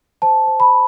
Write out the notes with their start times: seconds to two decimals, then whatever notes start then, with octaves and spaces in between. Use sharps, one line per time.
0.22 C5 A5
0.47 C5
0.60 B5